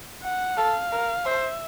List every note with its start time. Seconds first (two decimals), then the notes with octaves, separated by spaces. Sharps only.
0.23 F#5
0.57 A4 F5
0.92 A#4
1.25 C5 E5